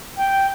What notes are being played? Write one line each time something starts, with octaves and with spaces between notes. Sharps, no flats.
G5